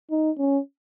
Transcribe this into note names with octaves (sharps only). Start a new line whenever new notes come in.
D#4
C#4